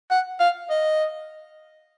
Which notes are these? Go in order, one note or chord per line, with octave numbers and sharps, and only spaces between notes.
F#5
F5
D#5